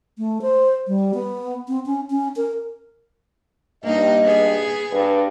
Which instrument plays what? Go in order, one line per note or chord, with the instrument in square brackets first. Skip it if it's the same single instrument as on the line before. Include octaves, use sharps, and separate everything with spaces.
[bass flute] A3
C5
G3
B3
C4
C#4
C#4
A#4
[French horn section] G2 D#5 [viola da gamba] A#3 D#4
[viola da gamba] B3 G#4
[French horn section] G2 B4